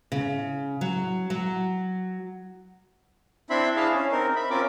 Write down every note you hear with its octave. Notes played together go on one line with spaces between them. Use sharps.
C#3
F#3
F#3
C4 D4 E4 E5 B5 C6
D4 E4 G#4 F5 A5
C#4
C4 D#4 A#4
E5 B5
C4 C#4 F4 A#4 D6